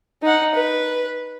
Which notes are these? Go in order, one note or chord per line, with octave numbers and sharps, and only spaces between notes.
D#4 F#5
B4